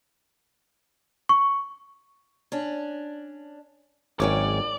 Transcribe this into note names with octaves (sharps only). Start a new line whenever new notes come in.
C#6
C#4 D4
G#1 F#3 C#4 C#5 D5 G5